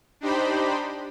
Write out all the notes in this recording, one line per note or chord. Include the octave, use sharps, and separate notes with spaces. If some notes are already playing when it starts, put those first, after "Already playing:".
D4 D#4 G4 C5 B5